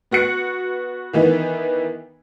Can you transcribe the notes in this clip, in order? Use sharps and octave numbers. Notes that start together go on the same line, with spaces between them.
B3 F#4 F#6 C#7
D#3 E3 B3 D#4